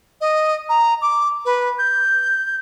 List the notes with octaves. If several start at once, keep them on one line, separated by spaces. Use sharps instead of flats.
D#5
A#5
D6
B4
G6